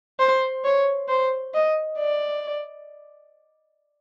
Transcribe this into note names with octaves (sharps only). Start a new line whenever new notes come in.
C5
C#5
C5
D#5
D5